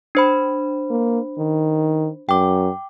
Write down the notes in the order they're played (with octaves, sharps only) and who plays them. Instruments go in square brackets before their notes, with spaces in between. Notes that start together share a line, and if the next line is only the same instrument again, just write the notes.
[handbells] D4 C5 B5
[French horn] A#3
D#3
[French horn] F#2 [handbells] G5 D6